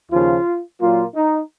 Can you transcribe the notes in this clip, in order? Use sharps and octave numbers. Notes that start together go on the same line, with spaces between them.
D#2 C#3 F3 F4
A#2 F#3 A#3 F4
D#4